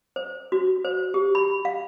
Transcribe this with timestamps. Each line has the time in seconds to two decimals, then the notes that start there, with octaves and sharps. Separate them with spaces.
0.16 C5
0.52 F#4
0.85 C5
1.14 G4
1.35 B5
1.65 F5